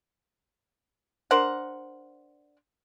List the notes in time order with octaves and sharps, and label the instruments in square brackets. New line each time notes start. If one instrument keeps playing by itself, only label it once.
[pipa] D4 A#4 C5 F#5